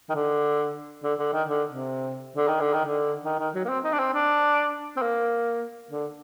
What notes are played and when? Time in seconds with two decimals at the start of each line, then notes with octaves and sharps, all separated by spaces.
0.09 D#3
0.15 D3
1.03 D3
1.19 D3
1.33 D#3
1.48 D3
1.69 C3
2.36 D3
2.48 D#3
2.60 D3
2.74 D#3
2.85 D3
3.25 D#3
3.39 D#3
3.54 F#3
3.65 A#3
3.69 C4
3.84 D#4
3.93 D4
3.99 C4
4.14 D4
4.97 C4
5.02 A#3
5.91 D3